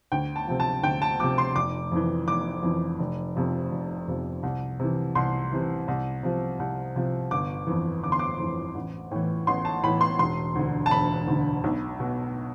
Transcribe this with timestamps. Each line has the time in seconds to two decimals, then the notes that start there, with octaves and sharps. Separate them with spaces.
0.12 D2 G5
0.36 A5
0.47 C3 F3
0.60 A5
0.83 D2 G5
1.02 A5
1.20 C3 F3 D6
1.38 C6
1.55 F1 D6
1.92 F2 E3
2.27 F1 D6
2.63 F2 E3
3.00 F1
3.36 F2 C3 F3
3.71 F1
4.08 F2 C3 F3
4.43 C2
4.80 C3 E3
5.15 C2 C6
5.52 C3 E3
5.88 C2
6.23 C3 F3
6.59 C2
6.96 C3 F3
7.31 G1 D6
7.67 F2 E3
8.03 G1 D6
8.12 C6
8.19 D6
8.39 F2 E3
8.75 A1
9.11 A2 E3
9.47 A1 C6
9.65 A5
9.83 A2 E3 B5
10.01 C6
10.19 E1 C6
10.55 D2 D3
10.86 A5
10.91 E1 B5
11.27 D2 D3
11.64 B1
12.00 B2